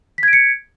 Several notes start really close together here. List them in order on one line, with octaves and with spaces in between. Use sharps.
B6 G#6 D7 C#7